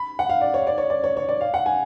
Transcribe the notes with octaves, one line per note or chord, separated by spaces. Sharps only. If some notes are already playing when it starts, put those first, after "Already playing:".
Already playing: B5
F#5
F5
D5
C#5
D5
C#5
D5
C#5
C#5
D5
F5
F#5
G#5